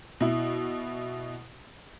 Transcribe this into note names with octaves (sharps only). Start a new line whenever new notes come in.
B2 E4